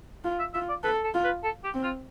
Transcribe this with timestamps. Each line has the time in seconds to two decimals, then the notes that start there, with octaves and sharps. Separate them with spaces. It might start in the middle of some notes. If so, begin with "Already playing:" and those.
0.24 F4
0.39 E5
0.54 F4 E5
0.69 D5
0.84 A4 B4
1.04 A4
1.14 F4
1.24 B4
1.44 A4
1.64 G4
1.74 C4
1.84 F4